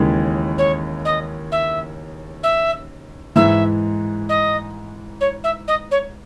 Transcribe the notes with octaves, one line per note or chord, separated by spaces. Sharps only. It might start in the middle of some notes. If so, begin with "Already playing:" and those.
Already playing: D#2 C#3 E3 G#3
C#5
D#5
E5
E5
G#2 E3 G#3 E5
D#5
C#5
E5
D#5
C#5